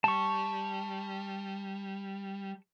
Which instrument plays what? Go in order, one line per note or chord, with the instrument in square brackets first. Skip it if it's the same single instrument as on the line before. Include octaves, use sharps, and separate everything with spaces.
[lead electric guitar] G3 [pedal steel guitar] A5 C#6